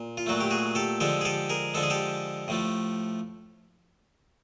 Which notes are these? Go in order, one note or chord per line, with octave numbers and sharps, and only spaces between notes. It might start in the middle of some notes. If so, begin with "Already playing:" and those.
Already playing: A#2
F4
A#2 F#3 A3 F#4
G4
F#4 G#4
G4 A4
D3 F3 G#3 G4 A4
G#4
G4 A4
G#4 A#4
D3 F3 G#3 A4
G#4
G4 A4
A2 F3 A3